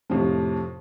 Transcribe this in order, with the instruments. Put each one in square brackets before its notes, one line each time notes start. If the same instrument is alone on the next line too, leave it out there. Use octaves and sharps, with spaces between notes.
[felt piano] F2 A2 C3 F3